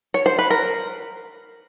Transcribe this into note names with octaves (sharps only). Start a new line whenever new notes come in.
C#5
C5
B4
A#4